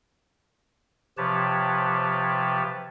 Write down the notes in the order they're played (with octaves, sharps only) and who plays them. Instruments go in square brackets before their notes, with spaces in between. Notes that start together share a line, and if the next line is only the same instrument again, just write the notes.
[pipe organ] C3 F3 G4 B4 C#5 A5